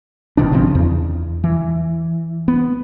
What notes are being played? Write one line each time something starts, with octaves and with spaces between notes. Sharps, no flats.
D1 B2 D#3 D4
G1 C#3 F3 C4
E2
E3
B3